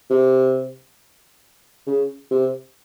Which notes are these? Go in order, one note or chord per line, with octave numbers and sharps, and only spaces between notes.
C3
C#3
C3